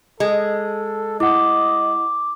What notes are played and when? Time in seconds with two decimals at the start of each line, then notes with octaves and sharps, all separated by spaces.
0.20 G#3 A4
1.20 E4 D#5 F#5 D6